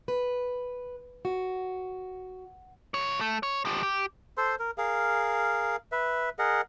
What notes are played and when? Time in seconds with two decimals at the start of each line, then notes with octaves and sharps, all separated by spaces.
0.08 B4
1.25 F#4
2.94 C2 C#5
3.21 A3
3.43 C#5
3.65 F3 G4
3.83 G4
4.37 A4 C5 C6
4.59 A#4
4.78 G#4 A#4 F5
5.92 B4 E5
6.39 G#4 A#4 D#5 F#5